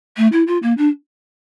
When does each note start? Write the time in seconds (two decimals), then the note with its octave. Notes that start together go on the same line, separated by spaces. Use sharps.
0.17 A3
0.32 E4
0.47 F4
0.62 A#3
0.78 D4